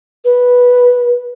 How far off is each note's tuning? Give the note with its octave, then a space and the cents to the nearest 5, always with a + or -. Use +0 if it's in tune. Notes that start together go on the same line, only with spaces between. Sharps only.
B4 -10